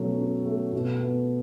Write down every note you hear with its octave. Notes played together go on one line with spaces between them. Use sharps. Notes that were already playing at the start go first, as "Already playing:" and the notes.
Already playing: B2 F#3 A3 C#4
C#4
A3
B2
B3